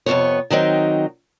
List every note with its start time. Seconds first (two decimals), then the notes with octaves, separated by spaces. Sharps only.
0.06 F2 C3 E3 B3 C#5
0.50 D#3 F#3 C4 D#4